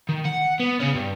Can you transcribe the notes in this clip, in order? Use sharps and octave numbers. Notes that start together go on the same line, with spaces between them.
D#3
F#5
B3
C#3 C#4
G2